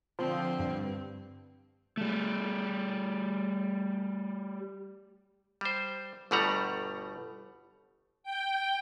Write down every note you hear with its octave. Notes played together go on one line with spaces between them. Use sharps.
D3 F3 C4
G2
G3 A3
G3 C5
G1 B2 G3 A3 F#5 A#5
G5